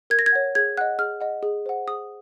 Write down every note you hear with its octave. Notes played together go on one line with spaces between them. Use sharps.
A#4 G#6
A#6
G#6
C#5 F#5
G#4 G#6
D#5 F#5 F#6
G#4 F6
D#5 F#5
G#4
C5 F#5
G#4 D#6